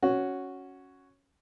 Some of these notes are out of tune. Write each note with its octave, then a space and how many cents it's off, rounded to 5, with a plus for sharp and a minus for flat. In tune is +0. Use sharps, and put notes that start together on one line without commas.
C#4 +0 F#4 +0